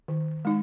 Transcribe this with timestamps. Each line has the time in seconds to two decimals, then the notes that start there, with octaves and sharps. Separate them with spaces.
0.08 D#3
0.45 G#3 D#4